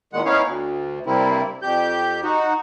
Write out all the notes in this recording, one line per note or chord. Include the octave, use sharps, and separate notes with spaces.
E2 A#2 D#3 G#3 F#5
B3 C#4 D#4 E4 C#5 F5
D2
G2 C3 A#3 C4 E4
F2 G4 G6
D#4 F#4